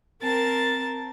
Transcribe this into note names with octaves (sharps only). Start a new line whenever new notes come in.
C4 A#4 A5 A6